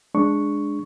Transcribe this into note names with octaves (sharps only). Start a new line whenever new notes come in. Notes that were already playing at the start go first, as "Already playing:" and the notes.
G#3 D4 C#6